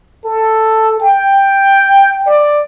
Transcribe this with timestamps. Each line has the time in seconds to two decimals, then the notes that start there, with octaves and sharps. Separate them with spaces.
0.25 A4
1.00 G5
2.26 D5